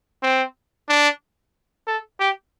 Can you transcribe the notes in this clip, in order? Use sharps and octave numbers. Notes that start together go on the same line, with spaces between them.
C4
D4
A4
G4